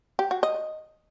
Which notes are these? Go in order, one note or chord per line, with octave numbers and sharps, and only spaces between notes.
G4
F#4
D#5